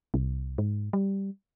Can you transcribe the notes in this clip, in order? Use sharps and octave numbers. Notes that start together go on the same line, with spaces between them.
C2
G#2
G3